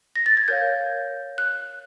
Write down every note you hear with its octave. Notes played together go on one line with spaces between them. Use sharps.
A#6
A6
G#6
A#4 C#5 F5 G6
F#6